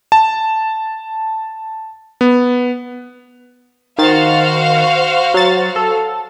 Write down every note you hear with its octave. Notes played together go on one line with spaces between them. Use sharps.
A5
B3
D#3 F#4 C5 F5 A6
F#3 A6
A4